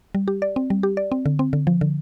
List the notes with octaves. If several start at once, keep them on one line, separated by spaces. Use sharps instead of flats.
G3
G4
D5
C4
G3
G4
D5
C4
D3
C4
D3
F3
D3